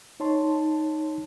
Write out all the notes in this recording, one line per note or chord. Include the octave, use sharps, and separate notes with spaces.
D#4 C#5 A5 C6